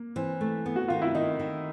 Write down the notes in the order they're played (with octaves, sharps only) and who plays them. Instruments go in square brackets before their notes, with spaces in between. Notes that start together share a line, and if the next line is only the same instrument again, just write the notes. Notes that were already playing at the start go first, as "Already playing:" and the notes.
Already playing: [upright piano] A#3
[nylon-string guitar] E3 [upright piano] C4
[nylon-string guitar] A3
B3
[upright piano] F#4
[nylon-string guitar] D#3 [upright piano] F4
[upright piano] E4
[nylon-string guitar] D#3 [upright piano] D#4
[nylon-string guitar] D#3